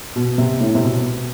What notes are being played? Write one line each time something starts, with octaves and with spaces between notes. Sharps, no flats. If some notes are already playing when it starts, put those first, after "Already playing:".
B2
C3
A2
C3
B2